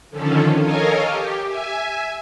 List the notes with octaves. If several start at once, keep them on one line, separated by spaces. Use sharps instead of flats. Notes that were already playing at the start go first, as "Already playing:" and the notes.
D3 D#3 F3 C#4 A4
A4 A#4 C#5 D#5 F5 G#5
G4
E5 G#5